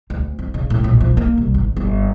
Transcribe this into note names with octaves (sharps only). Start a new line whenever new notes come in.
D2
F2
C#3
A2
A#1
F3
A#3
C2
G#1
G1